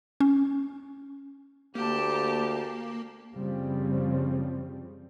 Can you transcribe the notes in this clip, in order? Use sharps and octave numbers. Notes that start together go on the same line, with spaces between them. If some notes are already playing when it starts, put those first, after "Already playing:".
C#4
D2 A#3 G4 A5
F#1 C#3 F3 G3 C4